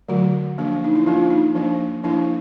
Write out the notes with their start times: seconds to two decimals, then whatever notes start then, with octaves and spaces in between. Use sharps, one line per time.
0.09 D3 F#3 A3 F#4
0.58 F3 A#3 D4
0.84 D#4
0.95 E4
1.06 F3 A#3 D4 F4
1.30 D#4
1.55 F3 A#3 D4
2.04 F3 A#3 D4 E4